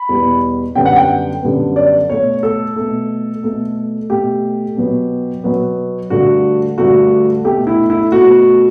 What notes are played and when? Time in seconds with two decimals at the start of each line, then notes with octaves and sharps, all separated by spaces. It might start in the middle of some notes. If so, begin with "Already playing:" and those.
Already playing: B5
0.09 E2 B2 G3 B3
0.75 F#2 D3 G3 B3 G5
0.86 F#5
0.96 G5
1.42 F#2 D3 G3 B3
1.76 D5
2.09 B2 A3 C#5
2.43 A4
2.76 B2 A3
3.43 B2 A3
4.10 B2 A3 G4
4.77 B2 F#3 B3
5.44 B2 F#3 B3
6.10 G2 D3 A3 F#4
6.78 G2 D3 A3 F#4
7.44 B2 A3 G4
7.67 E4
7.90 E4
8.12 B2 A3 F#4